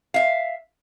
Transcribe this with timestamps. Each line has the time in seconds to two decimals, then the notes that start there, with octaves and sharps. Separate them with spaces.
0.14 E5 F5